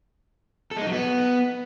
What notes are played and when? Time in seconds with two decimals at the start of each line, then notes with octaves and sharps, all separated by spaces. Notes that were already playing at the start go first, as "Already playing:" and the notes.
0.71 A4
0.77 G#3
0.82 D#4
0.87 F#3
0.92 B3